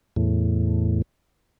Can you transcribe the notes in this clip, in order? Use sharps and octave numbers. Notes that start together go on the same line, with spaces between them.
E2 A2